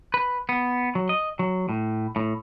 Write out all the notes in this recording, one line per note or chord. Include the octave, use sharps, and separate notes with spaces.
B4
B3
F#3
D#5
F#3
A2
A2